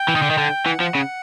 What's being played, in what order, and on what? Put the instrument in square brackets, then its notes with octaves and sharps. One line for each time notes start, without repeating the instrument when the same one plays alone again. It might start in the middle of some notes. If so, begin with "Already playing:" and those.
Already playing: [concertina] G5
[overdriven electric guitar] E3
D#3
D3
D#3
D3
[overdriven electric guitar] E3 [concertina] F#5
[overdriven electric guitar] F3
C#3